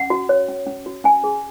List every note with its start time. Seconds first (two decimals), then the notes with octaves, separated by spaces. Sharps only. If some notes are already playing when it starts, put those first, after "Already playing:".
Already playing: C#4 F#5
0.10 F#4
0.29 C#5
0.49 C#4
0.67 C#4
0.86 F#4
1.04 C#4 G#5
1.24 G#4